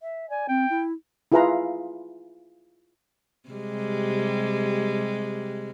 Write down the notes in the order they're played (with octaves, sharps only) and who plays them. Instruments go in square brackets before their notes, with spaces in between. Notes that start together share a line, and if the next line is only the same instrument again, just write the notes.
[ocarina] E5
[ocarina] D5 [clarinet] G#5
[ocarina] C4 [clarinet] G5
[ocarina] E4
[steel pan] E4 F4 G#4 B4 F5 A#5
[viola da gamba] C3 G3 G#3